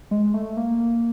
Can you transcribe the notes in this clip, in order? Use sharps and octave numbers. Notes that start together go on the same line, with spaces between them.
G#3
A3
A#3